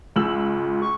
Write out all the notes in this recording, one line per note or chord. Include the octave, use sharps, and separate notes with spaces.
C#2 F4 E6 F#7
C#6